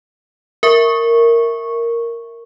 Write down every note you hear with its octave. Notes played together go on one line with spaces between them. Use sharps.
A#4 E5 C#6